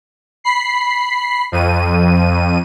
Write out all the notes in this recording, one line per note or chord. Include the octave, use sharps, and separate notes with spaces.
B5 C7
F2 D#7